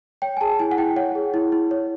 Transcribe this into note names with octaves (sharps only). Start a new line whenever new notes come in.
C#5 G5
G#5
G#4 A5
E4 G#5
F#5
E4 G5
C#5 F#5
G#4
E4
E4
C#5